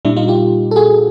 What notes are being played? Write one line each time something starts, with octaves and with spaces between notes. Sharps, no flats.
A#2 G3 D4 E4
D#4 F4
F4 G4
A4
F#4 G#4